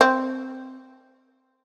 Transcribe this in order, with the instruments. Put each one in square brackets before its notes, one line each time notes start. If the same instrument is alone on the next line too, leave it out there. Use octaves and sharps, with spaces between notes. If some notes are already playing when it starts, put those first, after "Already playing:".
[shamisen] C4